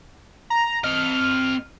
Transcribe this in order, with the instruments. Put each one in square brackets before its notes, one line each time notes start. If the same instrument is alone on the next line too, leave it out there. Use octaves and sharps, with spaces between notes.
[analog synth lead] A#5
[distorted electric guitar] C4 D#5 [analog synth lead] F6